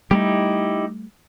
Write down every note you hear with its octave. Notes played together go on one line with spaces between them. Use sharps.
G3 A3 D#4 E4 G4